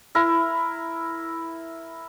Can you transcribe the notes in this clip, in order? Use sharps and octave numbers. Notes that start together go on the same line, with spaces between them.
E4 A#4